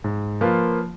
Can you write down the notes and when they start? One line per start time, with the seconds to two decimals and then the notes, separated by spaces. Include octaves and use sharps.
0.04 G#2
0.41 F3 A#3 F4 B4